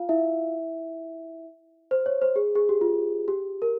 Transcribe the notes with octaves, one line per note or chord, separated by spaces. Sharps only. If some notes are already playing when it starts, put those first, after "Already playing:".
Already playing: F4 F5
E4 E5
C5
C#5
C5
G#4
G#4
G4
F4
G4
A#4